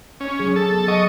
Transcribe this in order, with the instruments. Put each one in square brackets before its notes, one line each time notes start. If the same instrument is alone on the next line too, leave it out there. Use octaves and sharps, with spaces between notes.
[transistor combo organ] C#4
[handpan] F#3 G#4
[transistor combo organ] A4
[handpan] B3
[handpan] F#3 F#5 [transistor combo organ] D#5 C#6